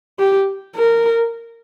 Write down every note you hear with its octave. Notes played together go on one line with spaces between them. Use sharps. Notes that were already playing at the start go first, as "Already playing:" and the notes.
G4
A#4